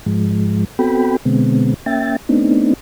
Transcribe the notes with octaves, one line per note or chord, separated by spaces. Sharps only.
G#2 F3 G#3
B3 C4 F#4 A4 G5 B5
B2 D3 G#3 B3 C4
A#3 C#4 E5 G5 A6
A3 B3 C4 D4 D#4